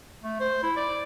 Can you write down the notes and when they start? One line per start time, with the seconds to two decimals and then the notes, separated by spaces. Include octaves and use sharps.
0.23 A3
0.40 C5
0.63 E4
0.76 D5